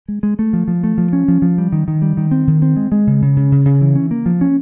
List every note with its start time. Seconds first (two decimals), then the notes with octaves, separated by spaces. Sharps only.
0.08 G#3
0.23 G#3
0.39 A3
0.53 F3
0.68 F3
0.84 A3
0.98 F3
1.13 C#4
1.28 F3
1.42 F3
1.58 G3
1.72 D#3
1.88 D#3
2.02 G3
2.17 D#3
2.31 C4
2.47 D#3
2.62 C4
2.76 G#3
2.92 G#3
3.07 C#3
3.22 C#3
3.37 C#3
3.52 C#3
3.65 C#3
3.81 E3
3.95 C#4
4.11 A#3
4.26 F3
4.41 C#4